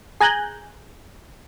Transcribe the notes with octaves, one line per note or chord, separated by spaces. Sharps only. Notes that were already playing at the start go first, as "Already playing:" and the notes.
G#4 G#5 A#5 F#6 G6